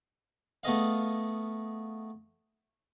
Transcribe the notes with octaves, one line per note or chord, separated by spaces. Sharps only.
A3 B3 G#4 D#5 F5